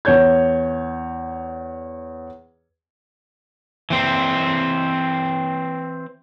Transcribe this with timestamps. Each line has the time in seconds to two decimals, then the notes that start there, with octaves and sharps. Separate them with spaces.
0.05 E2 C#5 G6 G#6
3.90 E3 C4